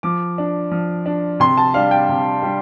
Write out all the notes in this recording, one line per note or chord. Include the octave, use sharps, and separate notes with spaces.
F3 D6
D4
F3
D4
C3 C6
A5
G3 D4 F5
G5
C3
G3 D4